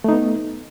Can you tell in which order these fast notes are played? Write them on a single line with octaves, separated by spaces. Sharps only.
A3 D#4 B3